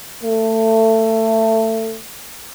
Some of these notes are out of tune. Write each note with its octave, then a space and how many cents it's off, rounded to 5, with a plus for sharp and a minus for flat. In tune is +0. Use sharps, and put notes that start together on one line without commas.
A3 +20